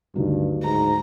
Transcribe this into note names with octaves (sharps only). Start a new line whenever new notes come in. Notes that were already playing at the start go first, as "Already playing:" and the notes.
D2 G2 D#3 F#3
G#2 A#5